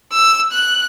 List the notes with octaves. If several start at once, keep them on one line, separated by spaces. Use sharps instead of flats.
E6
F#6